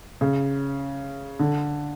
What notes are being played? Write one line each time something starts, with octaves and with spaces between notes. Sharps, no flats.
C#3
D3